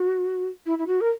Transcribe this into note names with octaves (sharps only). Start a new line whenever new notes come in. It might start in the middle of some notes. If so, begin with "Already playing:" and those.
Already playing: F#4
E4
E4
F#4
A#4